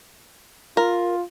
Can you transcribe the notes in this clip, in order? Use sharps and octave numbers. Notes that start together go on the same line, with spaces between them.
F4 A#4